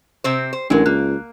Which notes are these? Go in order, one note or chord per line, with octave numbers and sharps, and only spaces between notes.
C3 C4 C5
C5
A1 F#3 G#3 D4 A#4
C#2 A#3 F#6